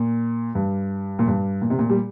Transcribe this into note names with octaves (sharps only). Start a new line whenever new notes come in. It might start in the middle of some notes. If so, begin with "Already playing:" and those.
Already playing: A#2
G2
A#2
G2
A#2
C3
A#2
G3